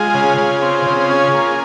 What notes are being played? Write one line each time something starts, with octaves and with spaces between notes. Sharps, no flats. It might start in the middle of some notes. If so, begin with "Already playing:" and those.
Already playing: G#3 F4 G#4
C#3
C#3
C4
C#3
C#4
A#3